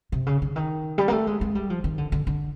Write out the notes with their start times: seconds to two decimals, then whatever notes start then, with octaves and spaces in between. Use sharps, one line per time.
0.12 C3
0.26 C#3
0.42 D3
0.56 D#3
0.98 G3
1.08 A#3
1.12 A3
1.27 G#3
1.41 G#3
1.55 G3
1.70 F3
1.84 D#3
1.98 D3
2.12 D3
2.27 D3